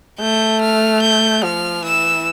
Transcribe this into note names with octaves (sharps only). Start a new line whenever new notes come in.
A3 G6
F6
G6
F3 F6
E3 E6